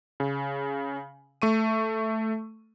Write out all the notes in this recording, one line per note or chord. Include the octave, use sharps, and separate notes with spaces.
C#3
A3 C#6 D#7